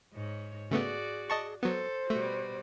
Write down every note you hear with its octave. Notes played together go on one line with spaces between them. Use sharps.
G#2 C#5
C#3 A3 B3 F#4 G#4 D5
D#5 A5 C#6
F#3 B3 A4 C5
B2 G3 A3 F#4